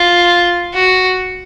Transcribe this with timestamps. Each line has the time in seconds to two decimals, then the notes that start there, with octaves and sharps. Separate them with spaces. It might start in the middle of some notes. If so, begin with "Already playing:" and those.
Already playing: F4
0.74 F#4